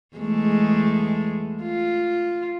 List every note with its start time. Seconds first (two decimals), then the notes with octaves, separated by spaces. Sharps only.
0.17 E2 G#3 A3
1.63 F4